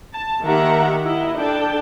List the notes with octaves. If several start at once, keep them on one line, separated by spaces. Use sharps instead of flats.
A5
D#3 A#3 G4 E5 F#5 A#5
E4 D#5
D4 A4 G5 A5